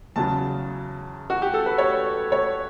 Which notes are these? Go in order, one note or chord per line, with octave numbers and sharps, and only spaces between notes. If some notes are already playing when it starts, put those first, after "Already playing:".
E2 C#3 F#3 A5
F#4
G4
A4
B4
C#5
C#5